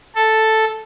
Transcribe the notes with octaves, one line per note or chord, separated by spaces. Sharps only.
A4